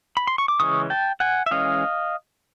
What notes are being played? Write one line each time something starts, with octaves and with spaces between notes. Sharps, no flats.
B5
C6
C#6
D6
C#3 E3 G#3 C#4 C#6 D#6
G5 A5
F#5 G#5
E5
E3 G#3 C#4 D#5 F5